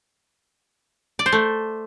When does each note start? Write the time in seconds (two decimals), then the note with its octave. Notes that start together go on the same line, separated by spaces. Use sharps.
1.19 D5
1.26 C5
1.32 A3